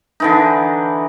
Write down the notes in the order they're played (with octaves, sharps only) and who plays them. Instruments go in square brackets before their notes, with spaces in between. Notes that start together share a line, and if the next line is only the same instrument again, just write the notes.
[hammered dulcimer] D3 E3 D#4